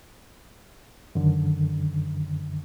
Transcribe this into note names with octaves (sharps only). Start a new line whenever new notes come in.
F#2 D3 D#3